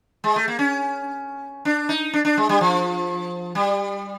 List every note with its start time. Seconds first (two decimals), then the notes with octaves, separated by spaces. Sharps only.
0.24 G#3
0.36 A3
0.48 A#3
0.59 C#4
1.65 D4
1.89 D#4
2.13 D4
2.25 D4
2.37 G#3
2.49 G3
2.61 F3
3.55 G3